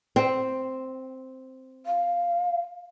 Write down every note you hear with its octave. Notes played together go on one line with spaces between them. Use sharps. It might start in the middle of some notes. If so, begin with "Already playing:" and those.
C4
F5